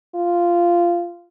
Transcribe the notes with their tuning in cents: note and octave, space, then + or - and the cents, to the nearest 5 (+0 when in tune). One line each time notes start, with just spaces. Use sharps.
F4 -10